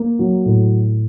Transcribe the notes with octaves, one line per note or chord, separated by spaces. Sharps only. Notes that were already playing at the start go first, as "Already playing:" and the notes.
Already playing: A#3
F#3
A2